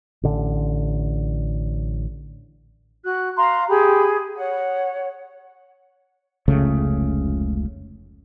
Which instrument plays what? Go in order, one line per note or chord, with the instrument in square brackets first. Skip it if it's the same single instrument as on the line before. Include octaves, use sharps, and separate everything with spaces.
[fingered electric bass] A1 D3
[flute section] F#4 F#6
F5 A#5 C6
G4 G#4 B5
C#5 F#5
[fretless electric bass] F1 C#2 C#3 A3